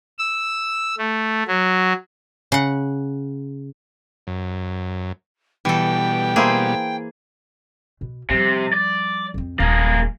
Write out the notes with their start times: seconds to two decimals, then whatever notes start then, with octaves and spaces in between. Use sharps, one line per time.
0.19 E6
0.98 A3
1.48 F#3
2.52 C#3 F#5
4.27 F#2
5.65 B2 E3 G3 A4 G5
6.36 A#3 E4 G#4 C5
8.01 B2
8.30 C3 F3 G3
8.73 D5
9.34 F2 C4
9.59 D#1 F2 A#3 G#4